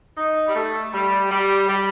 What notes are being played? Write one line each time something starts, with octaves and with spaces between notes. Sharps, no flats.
D#4
G3
A3
G3
G3
G3